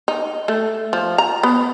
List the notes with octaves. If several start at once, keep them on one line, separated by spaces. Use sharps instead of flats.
D#4
A3
F3
A#5
B3